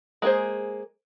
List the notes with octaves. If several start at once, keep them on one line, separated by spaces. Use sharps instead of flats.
G#3 A#3 G#4 C5